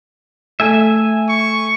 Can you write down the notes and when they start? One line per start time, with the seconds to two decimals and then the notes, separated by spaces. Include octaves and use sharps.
0.60 A3 E5 G#5
1.29 C#6